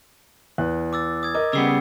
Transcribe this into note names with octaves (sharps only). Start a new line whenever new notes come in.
E2 F#6
D6 E6 A6
D#6 G#6
A#4 D#5 D6
C#3 G3 B3 E6 C7